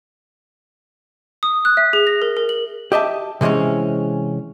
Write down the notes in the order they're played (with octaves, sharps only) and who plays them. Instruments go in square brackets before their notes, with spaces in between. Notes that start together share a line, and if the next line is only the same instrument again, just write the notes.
[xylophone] D#6
F#6
E5
G#4
A#6
A#4
A#4
F#7
[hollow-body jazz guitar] G4 D#5 E5 A5
C3 E3 G#3 C4 C#4